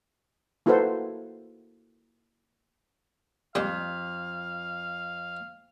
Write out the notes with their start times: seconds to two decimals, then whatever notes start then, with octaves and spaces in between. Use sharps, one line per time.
0.66 A#3 E4 F#4 A4 B4 C5
3.55 F2 G3 G#3 F5